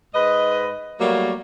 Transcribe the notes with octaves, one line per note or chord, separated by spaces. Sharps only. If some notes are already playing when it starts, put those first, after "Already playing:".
G#2 B4 D#5
F#3 G3 A3 A#3